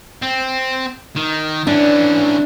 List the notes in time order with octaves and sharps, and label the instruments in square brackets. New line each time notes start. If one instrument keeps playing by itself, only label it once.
[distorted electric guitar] C4
D#3
[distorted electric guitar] E3 C#4 [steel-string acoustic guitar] D4